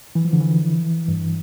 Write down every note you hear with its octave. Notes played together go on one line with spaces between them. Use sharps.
E3
F3
D3
E3
G2